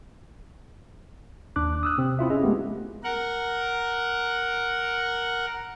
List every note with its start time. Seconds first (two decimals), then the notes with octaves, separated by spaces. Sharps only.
1.56 D#2 D4 D6 F#6
1.83 D#6 E6 F#6
1.98 C3 C4
2.19 C4 E4 F4 E5
2.30 C#4 G#4 D#5
2.42 G#3 A3 B3 G4
3.04 A#4 F#5